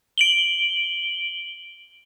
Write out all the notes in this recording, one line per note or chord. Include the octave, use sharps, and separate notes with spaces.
D7 F#7 G7